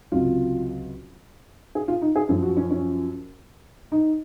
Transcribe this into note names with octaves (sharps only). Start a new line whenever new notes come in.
C#2 C3 F#3 F4
G#4
F4
D#4
G#4
F#2 F3 G#4
F#4
C#4
C#4
D#4